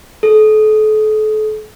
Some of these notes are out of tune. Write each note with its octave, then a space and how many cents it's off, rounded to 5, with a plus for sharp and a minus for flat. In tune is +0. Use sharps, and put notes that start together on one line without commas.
A4 -35